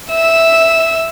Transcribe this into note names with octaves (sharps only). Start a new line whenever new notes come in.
E5 E6